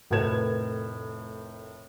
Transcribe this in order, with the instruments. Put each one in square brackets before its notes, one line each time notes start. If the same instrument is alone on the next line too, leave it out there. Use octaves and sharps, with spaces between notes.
[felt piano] F1 A2 A#4 B4 G#6 E7